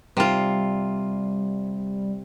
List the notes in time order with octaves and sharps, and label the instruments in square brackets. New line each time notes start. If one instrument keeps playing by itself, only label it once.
[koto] C3 F4 [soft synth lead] G3